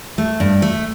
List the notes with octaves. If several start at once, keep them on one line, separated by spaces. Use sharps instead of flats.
A3
G2
A3